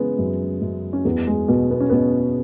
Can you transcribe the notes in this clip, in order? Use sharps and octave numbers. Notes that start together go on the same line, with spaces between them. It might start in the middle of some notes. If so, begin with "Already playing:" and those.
Already playing: C#3 E3 G#3 B3
F#2
F#2
C#4
E2 B3
G#3
B2 B3
B3
C#4
B2 B3